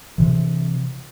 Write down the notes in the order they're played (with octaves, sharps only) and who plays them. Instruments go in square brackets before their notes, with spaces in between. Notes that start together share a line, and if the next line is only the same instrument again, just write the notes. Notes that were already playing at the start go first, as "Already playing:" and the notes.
[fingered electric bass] C3 E3